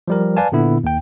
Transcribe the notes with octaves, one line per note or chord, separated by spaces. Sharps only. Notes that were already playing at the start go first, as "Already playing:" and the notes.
F3 G3 A#4
B4 D5 F5 G#5 A5
A#2 D3 B3 E4
D#2 G5